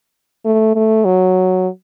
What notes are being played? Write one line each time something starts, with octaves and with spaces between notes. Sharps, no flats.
A3
A3
F#3